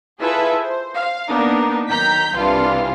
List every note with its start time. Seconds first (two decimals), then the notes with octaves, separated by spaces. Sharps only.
0.21 E4 F4 G#4 A4 B4 E5
0.60 C5
0.95 F5
1.28 A#3 B3 D4 D#4 A#4
1.89 D#3 F#3 A#5 G6 B6
2.37 C2 C3 E3 D4 F4 F5